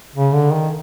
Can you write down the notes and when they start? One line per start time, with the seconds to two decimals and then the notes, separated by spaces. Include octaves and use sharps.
0.15 C#3
0.34 D3
0.53 D#3